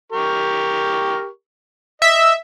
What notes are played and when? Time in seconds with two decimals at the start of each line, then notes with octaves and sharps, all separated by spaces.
0.12 G4 A#4 C#6
2.02 D#5 E5